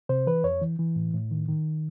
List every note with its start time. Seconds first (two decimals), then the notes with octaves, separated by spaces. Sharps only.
0.09 C3 C5
0.27 E3 B4
0.44 F2 C#5
0.61 E3
0.79 E3
0.96 A2
1.14 A2
1.31 D#3
1.48 D#3